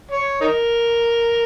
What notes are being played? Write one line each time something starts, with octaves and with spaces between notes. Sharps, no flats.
C#5
D#4 A#4